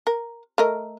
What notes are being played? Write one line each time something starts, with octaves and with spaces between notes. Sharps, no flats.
A#4
A3 A#4 D#5